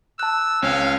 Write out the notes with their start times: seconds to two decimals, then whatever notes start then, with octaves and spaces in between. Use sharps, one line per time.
0.19 A5 E6 F#6
0.62 C#2 C4 C#4 F5